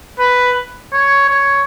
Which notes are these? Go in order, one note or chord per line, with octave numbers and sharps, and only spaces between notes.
B4
C#5
C#5